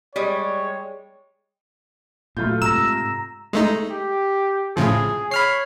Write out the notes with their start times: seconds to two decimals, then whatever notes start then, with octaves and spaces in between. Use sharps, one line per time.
0.16 G3 G#3 C#5
2.37 A#2 F#3 A3 F4 G6
2.62 G#2 C3 A#5 E6 A#6
3.53 G#3 A3 D#4
3.90 G4
4.77 A2 C#3 F3 G#4
5.31 C#5 B5 F6 C7